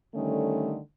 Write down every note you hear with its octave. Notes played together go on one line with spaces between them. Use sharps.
D3 D#3 G3 A3 C#4